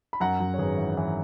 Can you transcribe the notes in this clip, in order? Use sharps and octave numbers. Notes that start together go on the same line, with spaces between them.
B5
F#2 F#5 A#5
F#2
C#5
G#1 G#4 B4
E3
E3